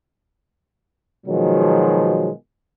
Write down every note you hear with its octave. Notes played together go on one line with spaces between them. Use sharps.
B2 D#3 F3 F#3 G#3